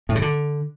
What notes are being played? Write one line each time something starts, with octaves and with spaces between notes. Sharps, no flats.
A2
C#3
D3